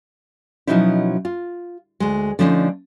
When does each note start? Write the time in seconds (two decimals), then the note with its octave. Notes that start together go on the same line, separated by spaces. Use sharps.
0.67 B2 F3 F#3 C#4 D#4 E4
1.25 F4
2.00 D2 G#3
2.39 D3 F3 A3 C#4 D#4 D5